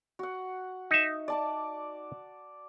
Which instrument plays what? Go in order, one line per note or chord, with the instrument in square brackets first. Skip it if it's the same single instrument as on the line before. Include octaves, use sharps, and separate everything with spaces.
[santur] F#4 F#5
[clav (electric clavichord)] D#4 E5
[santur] D5 A5 D6